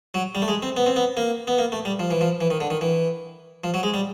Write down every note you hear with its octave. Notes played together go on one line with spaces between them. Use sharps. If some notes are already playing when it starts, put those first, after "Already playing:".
F#3
G3
A3
G#3
C4
B3
C4
B3
A#3
B3
A#3
A3
G3
F3
E3
F3
E3
D#3
D3
D#3
E3
F3
F#3
G#3
G3